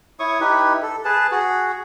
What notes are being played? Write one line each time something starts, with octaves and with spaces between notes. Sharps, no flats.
E4 C#5 C#6 D#6
D#4 E4 G4 B4
A4
G#4 B4 A5
F#4 G#4